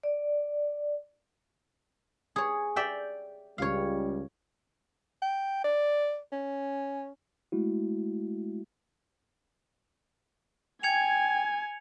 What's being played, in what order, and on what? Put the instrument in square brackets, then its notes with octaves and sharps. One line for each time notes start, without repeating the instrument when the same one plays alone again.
[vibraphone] D5
[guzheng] G#4 C#5
D5 E5 G5
[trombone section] C#2 G3 [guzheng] C#5 F5
[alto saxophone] G5
D5
C#4
[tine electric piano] G#3 A3 E4 F#4
[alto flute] G5 [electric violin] G#5 [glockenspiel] G#6 C#7 F7